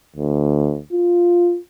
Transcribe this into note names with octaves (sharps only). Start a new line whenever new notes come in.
D2
F4